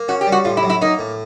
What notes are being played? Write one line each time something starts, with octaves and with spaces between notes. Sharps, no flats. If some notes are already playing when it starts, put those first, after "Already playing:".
Already playing: A#3
C#4 F#4
G4
G3
F#4
A2 F4
E4
F#3
E4
A#3 D#4
A2